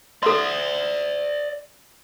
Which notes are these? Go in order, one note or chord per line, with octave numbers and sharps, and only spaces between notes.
A4 D5 E5 C6